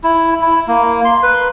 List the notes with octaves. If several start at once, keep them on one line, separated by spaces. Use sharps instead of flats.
E4
E4
A#3
C6
B4